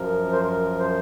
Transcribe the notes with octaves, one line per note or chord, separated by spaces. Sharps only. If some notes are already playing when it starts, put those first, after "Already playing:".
Already playing: F#2 F3 A#4
C5
A#4
C5